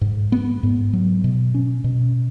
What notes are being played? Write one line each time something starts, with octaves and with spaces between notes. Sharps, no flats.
G#2
B3
G#2
F#3
B2
C#4
B2